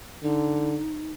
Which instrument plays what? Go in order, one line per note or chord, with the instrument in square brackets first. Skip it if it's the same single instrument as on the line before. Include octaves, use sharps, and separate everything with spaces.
[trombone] D3 [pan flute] D#4